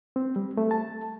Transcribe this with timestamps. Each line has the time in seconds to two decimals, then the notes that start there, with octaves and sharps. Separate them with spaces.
0.16 C4
0.36 G3
0.57 A3
0.71 A5